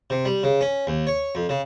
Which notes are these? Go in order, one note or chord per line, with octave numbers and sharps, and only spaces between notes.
C3
G3
C#3
C#4
D#2
C#5
F2
C#3